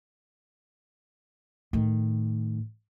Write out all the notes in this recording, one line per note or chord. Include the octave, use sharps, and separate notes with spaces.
A2 D#3